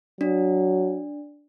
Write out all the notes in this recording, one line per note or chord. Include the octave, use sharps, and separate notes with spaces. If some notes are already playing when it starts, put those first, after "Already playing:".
F#3 D4